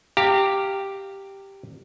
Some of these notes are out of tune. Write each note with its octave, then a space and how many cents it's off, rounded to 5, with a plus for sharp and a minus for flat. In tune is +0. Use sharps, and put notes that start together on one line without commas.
G4 +0 F5 +0 A#5 -30